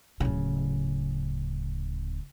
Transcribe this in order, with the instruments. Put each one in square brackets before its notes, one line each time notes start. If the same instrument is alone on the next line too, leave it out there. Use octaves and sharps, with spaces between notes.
[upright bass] D1 C#3